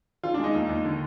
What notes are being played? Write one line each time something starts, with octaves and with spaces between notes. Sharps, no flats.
D#3 F4
D4
G#3
D#4
D#2
D#2
D3